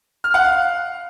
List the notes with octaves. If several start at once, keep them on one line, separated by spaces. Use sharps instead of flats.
F6
F#5
F5